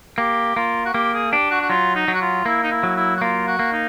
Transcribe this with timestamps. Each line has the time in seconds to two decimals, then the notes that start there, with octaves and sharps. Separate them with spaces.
0.18 A#3 G4
0.56 A#3 F4
0.85 F#4
0.94 A#3 G4
1.14 G#4
1.32 D4 G4
1.50 F#4
1.61 F#4
1.69 F#3 F4
1.95 D#4
2.08 F#3
2.14 F#4
2.21 F4
2.46 A#3 E4
2.63 D#4
2.71 E4
2.83 F#3
2.96 E4
3.16 F#4
3.21 A#3 F4
3.47 F#4
3.59 A#3
3.72 D#4